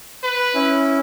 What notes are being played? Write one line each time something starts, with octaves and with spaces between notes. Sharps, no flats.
B4
C#4 E4